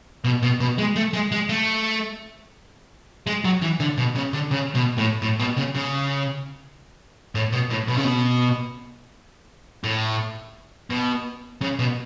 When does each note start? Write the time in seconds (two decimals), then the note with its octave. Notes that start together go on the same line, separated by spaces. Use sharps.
0.24 B2
0.43 B2
0.60 B2
0.78 G#3
0.96 A3
1.13 G#3
1.32 G#3
1.49 A3
3.27 G#3
3.44 F#3
3.62 E3
3.80 D3
3.98 B2
4.16 C#3
4.33 D3
4.51 C#3
4.75 B2
4.98 A2
5.22 A2
5.40 B2
5.57 C#3
5.75 C#3
7.35 A2
7.53 B2
7.71 A2
7.88 B2
7.97 C#3
8.05 B2
9.84 A2
10.90 B2
11.62 C#3
11.79 B2